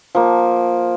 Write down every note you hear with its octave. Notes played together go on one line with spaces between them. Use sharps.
F3 A#3